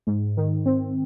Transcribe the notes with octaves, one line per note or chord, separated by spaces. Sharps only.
G#2
D#3
C4